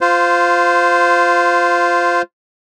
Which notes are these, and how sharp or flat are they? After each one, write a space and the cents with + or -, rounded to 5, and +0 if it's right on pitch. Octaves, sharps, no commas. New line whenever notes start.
F4 +0 C5 -15